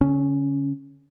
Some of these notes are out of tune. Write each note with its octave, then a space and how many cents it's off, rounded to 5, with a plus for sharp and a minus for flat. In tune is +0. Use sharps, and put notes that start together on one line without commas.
D3 -40 C#4 +0